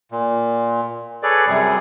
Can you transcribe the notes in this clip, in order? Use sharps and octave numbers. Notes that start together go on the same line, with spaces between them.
A#2
G#4 A4 B4 C#5 D5
F#2 C3 G3 G#4